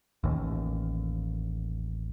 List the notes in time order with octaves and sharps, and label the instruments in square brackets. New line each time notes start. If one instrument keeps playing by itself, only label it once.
[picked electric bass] A1 D#2